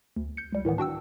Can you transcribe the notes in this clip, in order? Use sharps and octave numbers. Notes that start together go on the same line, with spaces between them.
D2
G6 C#7
C#2 G3
A2 D#3 E3 B3
D4 F#4 G5 E6